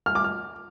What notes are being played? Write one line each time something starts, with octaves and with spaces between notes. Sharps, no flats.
F6
D6
F6